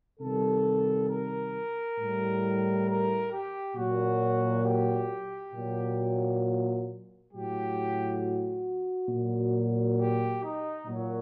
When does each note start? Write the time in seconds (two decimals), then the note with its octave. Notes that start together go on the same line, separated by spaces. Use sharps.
0.20 C3 D#3 G3 A4
1.09 A#4
1.98 A2 G3
2.87 A#4
3.32 G4
3.76 A#2 F#3 F#4
4.64 G4
5.53 A#2 F#3
7.31 A2 F#3 G4
8.20 F#4
9.09 A#2 F#3
9.98 G4
10.42 D#4
10.87 A#2 F#3